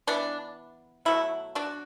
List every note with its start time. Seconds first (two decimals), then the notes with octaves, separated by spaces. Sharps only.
0.07 E3 B3 D4
1.05 B2 F#3 A3 E4
1.55 D4 F#4